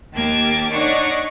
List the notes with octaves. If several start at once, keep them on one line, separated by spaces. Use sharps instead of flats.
D#2 A#3 G4 A5 D6 G#6
D4 D#4 C#5 F#5 C#6 D6